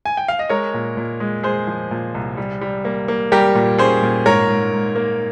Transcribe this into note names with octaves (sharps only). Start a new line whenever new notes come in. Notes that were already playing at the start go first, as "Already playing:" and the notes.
G#5
G5
F5
D#5
G#3 A#4 C#5
A#2
A#2
G#3
G#3 G#4 C5
F3
A#2
C2
G3
G3
A#3
A#3
G3 G4 A#4
A#2
C#4 G#4 C5
A#2
G#2 A#4 C#5
G#2
G#2
A#3